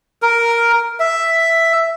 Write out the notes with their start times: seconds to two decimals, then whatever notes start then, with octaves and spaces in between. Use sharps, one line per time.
0.22 A#4
1.00 E5